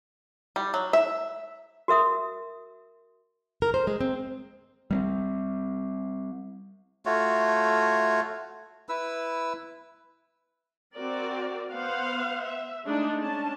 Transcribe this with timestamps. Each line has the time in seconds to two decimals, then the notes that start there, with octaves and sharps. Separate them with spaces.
0.56 G3
0.74 F#3
0.93 E5
1.88 F#4 A#4 E5 D#6
3.62 A#4
3.74 C5
3.87 G#3
4.01 C4
4.91 G3 A#3 C4
7.06 A3 F4 F#4 C#5
8.89 E4 B4 E6
10.95 C4 F#4 A#4 D5
11.72 B3 C5 F5 F#5
12.41 E5
12.84 G#3 A3 D4 D#4
13.20 C#4 D4 A5